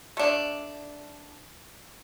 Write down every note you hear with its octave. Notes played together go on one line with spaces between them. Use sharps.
A3 D4